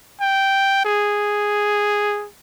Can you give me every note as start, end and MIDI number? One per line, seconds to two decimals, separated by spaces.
0.21 0.84 79
0.85 2.27 68